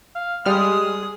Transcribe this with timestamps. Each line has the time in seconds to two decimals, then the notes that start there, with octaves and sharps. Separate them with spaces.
0.15 F5
0.45 G3 G#3 G#4 D#6 F6